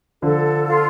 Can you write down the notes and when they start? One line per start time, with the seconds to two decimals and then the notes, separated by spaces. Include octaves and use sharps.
0.22 D3 F3 A4
0.65 F4